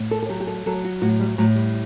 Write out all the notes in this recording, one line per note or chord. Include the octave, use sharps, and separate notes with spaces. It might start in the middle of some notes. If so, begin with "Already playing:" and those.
Already playing: A2
A4
A4
F#3 G4
G4
A4
F#3 A4
F#4
A2 F#4
G3
A2 F#3
G3